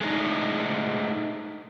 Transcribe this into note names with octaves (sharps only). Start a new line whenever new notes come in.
G#3 A3 D4 D#4